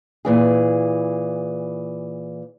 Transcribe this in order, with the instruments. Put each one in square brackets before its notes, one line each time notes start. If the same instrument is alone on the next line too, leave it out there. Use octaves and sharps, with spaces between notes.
[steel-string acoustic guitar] A#2 E3 G#4